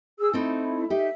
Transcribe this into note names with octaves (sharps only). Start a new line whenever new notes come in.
G#4 E6
A3 C4 D#4 E4
D#4 G4 E5